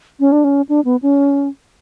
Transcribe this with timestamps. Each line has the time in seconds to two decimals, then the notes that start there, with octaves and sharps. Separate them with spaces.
0.20 C#4
0.32 D4
0.44 C#4
0.69 D4
0.85 B3
1.02 C#4